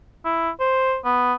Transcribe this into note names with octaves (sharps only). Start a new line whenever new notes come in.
E4
C5
B3